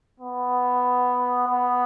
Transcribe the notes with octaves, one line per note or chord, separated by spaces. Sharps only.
B3
B3